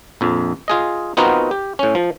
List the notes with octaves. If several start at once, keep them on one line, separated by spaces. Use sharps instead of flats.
A#1 F2
F4 G#4 D#5
B3 C4 D#4 F4 F#4 A#4
G4
A2 C#4
F3